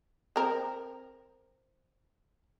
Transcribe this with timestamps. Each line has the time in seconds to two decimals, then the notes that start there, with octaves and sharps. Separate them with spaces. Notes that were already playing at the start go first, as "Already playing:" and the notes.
0.36 C4 A#4